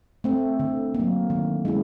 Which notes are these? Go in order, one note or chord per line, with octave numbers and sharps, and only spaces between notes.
A3 C4
D3
A#3
F#3
D#3
G#3 C#4 E4